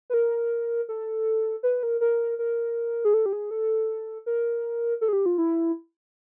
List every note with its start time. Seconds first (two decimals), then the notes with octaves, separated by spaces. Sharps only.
0.10 B4
0.14 A#4
0.89 A4
1.63 B4
1.83 A#4
2.01 A#4
2.39 A#4
3.05 G#4
3.14 A4
3.26 G4
3.33 G#4
3.51 A4
4.26 A#4
5.01 A4
5.08 G#4
5.13 G4
5.26 F4
5.38 E4